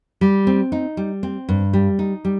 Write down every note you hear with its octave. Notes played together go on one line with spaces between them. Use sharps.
G3
C4
D#4
G3
C4
G2
G3
D#4
G3